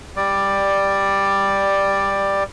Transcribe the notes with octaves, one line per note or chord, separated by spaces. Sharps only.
G3 D5